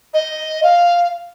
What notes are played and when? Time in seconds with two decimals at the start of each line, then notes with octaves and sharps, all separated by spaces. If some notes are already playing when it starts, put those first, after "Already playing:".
0.14 D#5
0.63 F5